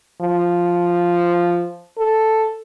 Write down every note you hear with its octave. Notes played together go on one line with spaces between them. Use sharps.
F3
A4